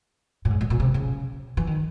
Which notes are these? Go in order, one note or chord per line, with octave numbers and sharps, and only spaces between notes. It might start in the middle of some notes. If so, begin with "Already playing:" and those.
A2
G#2
A2
A#2
C3
C#3
E3
D#3